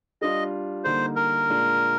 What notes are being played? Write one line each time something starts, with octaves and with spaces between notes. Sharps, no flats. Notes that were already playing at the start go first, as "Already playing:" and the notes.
G3 D4 F4 D#5
D3 G3 A#3 D#4 C5
A#4
A#2 G#3 D4 F4